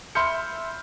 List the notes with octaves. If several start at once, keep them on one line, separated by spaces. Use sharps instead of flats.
E5 B5 C6 F6 G6 C#7